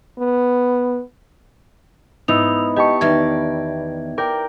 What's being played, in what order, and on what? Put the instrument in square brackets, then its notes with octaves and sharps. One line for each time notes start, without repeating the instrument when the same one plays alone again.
[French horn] B3
[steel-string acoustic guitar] G#2 [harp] B3 D#4 E4 [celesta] E6 F7
[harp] G4 A5 C#6 [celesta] D#5
[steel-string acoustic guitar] E2 D#3 D5 [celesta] B4 E5 G#6
[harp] A#4 D5 G5